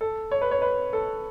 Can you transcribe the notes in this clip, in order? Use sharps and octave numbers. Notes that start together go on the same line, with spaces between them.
A4
C#5
B4
C#5
B4
A4